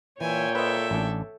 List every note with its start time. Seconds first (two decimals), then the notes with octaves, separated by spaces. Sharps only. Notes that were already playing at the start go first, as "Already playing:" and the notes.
0.21 A#2 E3 C#5 E5 G5 G#5
0.55 A4 B4 C5 D#5 E5
0.91 A1 D4